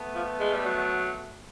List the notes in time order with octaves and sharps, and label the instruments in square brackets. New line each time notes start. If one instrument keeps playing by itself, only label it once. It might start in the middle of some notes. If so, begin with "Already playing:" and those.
Already playing: [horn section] A3 B3
[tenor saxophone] F3
G#3
G3
F#3